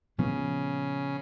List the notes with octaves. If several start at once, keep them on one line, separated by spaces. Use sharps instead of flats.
A#2 C#3 F3 B3